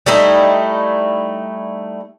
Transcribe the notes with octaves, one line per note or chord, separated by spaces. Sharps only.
G3 A3 D#4 E4